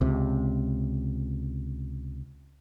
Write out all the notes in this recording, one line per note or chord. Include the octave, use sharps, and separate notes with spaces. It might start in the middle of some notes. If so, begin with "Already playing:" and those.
C#2 C3